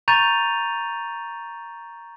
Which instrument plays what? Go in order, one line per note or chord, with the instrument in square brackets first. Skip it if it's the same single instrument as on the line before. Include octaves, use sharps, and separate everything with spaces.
[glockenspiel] A#5 C#6 G6 A6 D#7 F7